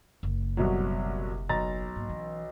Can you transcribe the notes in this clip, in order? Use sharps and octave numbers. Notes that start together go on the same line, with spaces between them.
F#1
C2 B2 F#3
B1 A#5 A6
G#2 A#3
E3 C#4